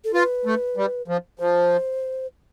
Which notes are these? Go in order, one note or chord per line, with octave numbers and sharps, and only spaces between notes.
A4
F4 B4
A3
G3
F3
F3 C5